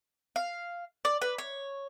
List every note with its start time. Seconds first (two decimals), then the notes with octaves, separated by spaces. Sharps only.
0.36 F5
1.05 D5
1.22 B4
1.38 C#5